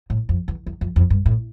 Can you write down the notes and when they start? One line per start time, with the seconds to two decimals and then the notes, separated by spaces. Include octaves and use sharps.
0.10 A2
0.29 F2
0.48 E2
0.66 E2
0.81 F2
0.96 F2
1.10 G2
1.26 A2